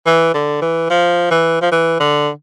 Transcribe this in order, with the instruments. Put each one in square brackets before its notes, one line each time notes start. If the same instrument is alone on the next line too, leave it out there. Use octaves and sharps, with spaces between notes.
[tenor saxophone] E3
D3
E3
F3
E3
F3
E3
D3